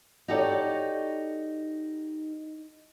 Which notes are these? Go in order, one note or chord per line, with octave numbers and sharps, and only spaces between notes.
D#4 F#4 G4 A4 C#5 D5